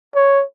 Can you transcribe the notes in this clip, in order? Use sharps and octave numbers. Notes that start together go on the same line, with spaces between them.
C#5